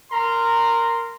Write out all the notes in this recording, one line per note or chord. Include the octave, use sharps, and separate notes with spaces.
A#4 A#5 C6